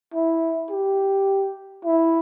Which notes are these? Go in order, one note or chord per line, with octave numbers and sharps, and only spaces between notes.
E4
G4
E4